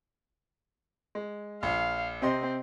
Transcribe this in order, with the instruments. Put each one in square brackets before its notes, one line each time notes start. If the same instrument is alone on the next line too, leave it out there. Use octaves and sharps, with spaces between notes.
[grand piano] G#3
[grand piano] A#1 [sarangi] F5
[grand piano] C3 D#5 C6 [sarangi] C4